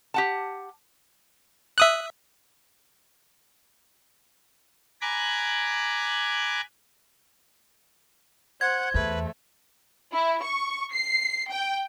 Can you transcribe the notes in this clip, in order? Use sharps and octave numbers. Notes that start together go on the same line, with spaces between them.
G4 F#5 A5
E5 D#6 F#6
G#5 A#5 B5 D6 F#6 G#6
C5 F#5 G#6
E2 A3 B4
E4
C#6
C7
G5